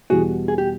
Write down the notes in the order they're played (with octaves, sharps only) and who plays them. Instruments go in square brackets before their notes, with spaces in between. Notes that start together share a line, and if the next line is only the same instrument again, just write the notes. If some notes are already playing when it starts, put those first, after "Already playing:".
[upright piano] E2 B2 G3 [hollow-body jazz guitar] F#4 G#4
[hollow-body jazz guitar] G#4
G4